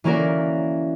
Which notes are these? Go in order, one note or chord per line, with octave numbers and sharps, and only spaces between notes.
E3 A#3 C#4 F#4 A#4 D5